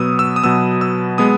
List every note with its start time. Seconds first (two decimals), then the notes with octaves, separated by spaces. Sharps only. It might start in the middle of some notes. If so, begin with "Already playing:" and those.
Already playing: B2 F#3 B3 D#6 E6
0.19 E6
0.36 D#6
0.44 B2 F#3 B3 E6
0.81 E6
1.18 G#3 B3 D#6